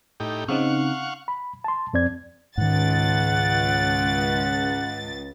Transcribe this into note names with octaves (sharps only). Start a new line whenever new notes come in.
A2 D#4 G4
C#3 C4 D#4 F5 F#5 C#6
B5
A5 C6
F2 C4 D5 G#6
C#2 G#2 D#3 F#5 A6